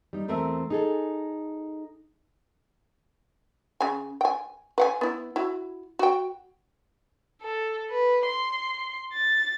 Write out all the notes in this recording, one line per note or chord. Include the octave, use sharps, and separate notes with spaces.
G3 D#4
E2 A3 C4 A#4 E5
D#4 G#4 A4
C#3 G#5
G5 G#5
B4 F#5 G#5
B3 E4
E4 F#4
F#4 G5
A4
B4
C6
A6